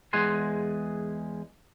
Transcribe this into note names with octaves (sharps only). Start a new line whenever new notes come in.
E2 G#3 G#4 F#5 G#5 C6